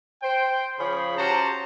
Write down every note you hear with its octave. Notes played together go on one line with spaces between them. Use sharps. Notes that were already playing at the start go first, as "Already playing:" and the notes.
C5 G5
C#3 F3 C#4 G#4 B5
C#4 F#4 G4 C5 A5 A#5